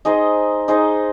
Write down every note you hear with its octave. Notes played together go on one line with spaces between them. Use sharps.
D#4 G#4 C5 D#5
D#4 G#4 C5 D#5